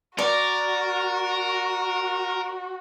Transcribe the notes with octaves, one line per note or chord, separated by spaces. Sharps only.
F#4 A#4 D5